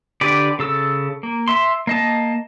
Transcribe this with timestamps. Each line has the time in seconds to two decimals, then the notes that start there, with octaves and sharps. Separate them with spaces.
0.21 D3 G4 B4 D5
0.59 C#3 A4 E6
1.23 A#3
1.48 E5 C6
1.87 A#3 D#5 A5